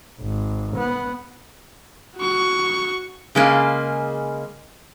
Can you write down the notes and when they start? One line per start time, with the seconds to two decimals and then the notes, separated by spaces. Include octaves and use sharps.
0.21 G#1
0.76 B3
2.18 F#4 C#6
3.35 C#3 G#3 A#3